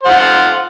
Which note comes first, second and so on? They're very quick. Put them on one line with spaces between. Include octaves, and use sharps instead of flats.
C5 F#5 F4